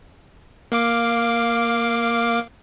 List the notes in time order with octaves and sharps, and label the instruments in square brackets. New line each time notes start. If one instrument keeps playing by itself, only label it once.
[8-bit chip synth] A#3 F5 D6